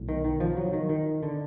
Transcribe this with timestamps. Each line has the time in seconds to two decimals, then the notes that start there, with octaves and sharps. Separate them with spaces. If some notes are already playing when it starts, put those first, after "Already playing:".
Already playing: B1 A2
0.09 D#3
0.24 D#3
0.40 F3
0.57 F#3
0.73 D#3
0.89 D#3
1.23 D3